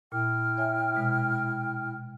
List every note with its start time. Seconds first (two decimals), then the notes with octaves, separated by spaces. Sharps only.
0.12 A#2 E4 G5 F6
0.57 C#5 E5 G#5
0.95 B2 G#3